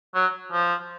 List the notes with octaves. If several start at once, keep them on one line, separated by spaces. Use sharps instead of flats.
F#3
F3